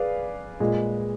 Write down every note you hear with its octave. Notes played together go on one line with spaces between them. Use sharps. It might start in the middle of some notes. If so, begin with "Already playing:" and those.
Already playing: G#4 B4 D5 F5
A#2 G#3